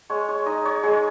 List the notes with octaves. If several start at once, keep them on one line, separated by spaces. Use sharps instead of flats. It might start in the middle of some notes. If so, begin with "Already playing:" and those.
G#3 C#5
C#5
D#4 D#5
C#5
G#3 G#4